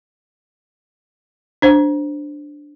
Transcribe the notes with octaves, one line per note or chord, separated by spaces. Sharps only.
D4 C5